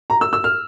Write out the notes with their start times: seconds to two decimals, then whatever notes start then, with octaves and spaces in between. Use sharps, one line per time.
0.10 A#5
0.21 E6
0.33 E6
0.44 F6